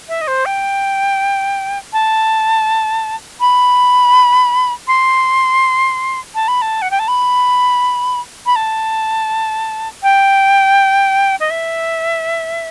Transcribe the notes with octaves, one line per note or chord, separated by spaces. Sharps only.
E5
D#5
C5
G5
A5
B5
C6
A5
B5
A5
F#5
G5
A5
B5
B5
A5
G5
D#5
E5